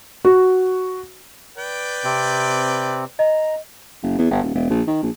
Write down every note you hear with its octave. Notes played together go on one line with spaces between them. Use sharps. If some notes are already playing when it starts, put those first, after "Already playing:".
F#4
B4 D5 G5
C3 C4
D#5 A#5
F#1
E2
G1
D#1
E1
A#1
D#3
A#1